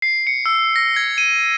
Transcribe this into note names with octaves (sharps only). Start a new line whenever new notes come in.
C7
C#7
E6
A#6
G#6
D#7